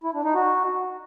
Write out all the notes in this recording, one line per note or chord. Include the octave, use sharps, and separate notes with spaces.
E4
D4
D#4
F#4